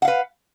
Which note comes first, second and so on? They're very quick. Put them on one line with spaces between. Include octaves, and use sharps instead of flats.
F#5 F5 B4